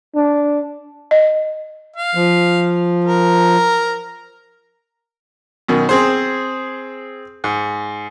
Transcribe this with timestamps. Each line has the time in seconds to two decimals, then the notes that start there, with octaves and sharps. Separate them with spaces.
0.15 D4
1.11 D#5
1.96 F5
2.15 F3
3.05 A#4
5.68 F#2 B2 D#3
5.89 C4 G#4 C5
7.44 G#2